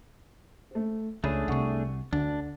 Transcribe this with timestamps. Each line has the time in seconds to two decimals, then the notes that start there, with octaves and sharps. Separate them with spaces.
0.71 A3 C5
1.24 C#2 A3 C#4 D4 G#4 C#5 B5
1.48 C2 C3 F#5 C#6
2.13 D2 D3 D4